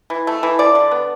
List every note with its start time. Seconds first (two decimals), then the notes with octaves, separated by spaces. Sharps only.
0.10 E3
0.27 A3
0.43 E3
0.59 D3 D5
0.75 D3
0.91 B3